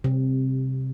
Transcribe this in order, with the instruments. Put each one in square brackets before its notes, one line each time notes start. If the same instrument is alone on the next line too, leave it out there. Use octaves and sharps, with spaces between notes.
[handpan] C3